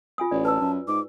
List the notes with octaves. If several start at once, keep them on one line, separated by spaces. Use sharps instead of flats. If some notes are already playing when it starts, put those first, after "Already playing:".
F4 G#5 D#6
A1 D5
B4 A5 E6
F#2
G#2 D6